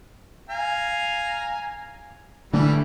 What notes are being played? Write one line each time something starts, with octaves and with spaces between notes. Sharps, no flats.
F5 G#5 A#5
D3 E3 G3 A3 D4